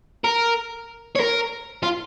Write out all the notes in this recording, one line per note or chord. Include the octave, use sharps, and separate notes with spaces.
A#4
C#5
A#4
F4